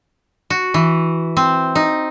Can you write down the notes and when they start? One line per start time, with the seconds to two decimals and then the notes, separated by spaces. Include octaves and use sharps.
0.50 F#4
0.74 E3
1.37 C4
1.75 D#4